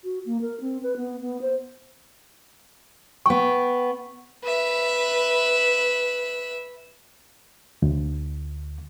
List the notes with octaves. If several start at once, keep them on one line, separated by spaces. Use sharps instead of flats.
F#4
A#3
A#4
C4
B4
B3
B3
C5
B3 G5 C#6
B4 E5
D2